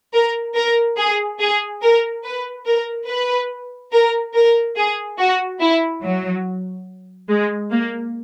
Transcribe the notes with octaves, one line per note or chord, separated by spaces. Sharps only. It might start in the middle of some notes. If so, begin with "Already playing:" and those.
A#4
A#4
G#4
G#4
A#4
B4
A#4
B4
A#4
A#4
G#4
F#4
E4
F#3
G#3
A#3